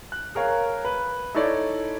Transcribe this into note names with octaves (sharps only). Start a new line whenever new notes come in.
F#6
G#4 A#4 C#5 F5
B4
D#4 E4 A4 C#5 D5